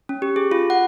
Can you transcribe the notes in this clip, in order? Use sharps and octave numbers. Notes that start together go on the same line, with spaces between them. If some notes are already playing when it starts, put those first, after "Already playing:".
C#4
G4
G#4
F4
F#5